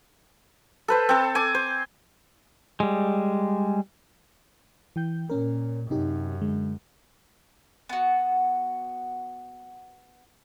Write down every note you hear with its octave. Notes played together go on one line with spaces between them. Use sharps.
A4 B4 C5
C4 A4
G#5 D6
C5
G3 G#3
E3 G5 G6
A#2 C#4 A#4
F#2 C3 D#4 G4
D3 G#3
B3 F#4